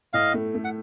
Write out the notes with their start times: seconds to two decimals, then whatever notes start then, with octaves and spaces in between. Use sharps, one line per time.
0.13 A2 D#5 F5
0.34 A3
0.55 A3
0.65 F#5